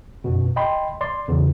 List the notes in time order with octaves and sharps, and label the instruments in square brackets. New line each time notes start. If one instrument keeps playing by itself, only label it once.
[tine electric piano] F#2 B2
D#5 G5 B5 C6
D5 C6
E2 C#3